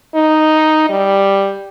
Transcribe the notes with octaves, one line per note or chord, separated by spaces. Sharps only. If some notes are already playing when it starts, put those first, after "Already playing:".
D#4
G3